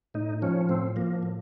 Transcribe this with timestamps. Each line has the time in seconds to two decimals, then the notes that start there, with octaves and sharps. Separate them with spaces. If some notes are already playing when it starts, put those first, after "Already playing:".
0.14 A2 D#4
0.42 F3 C#4
0.69 A2 C4
0.96 F3 A#3
1.23 A2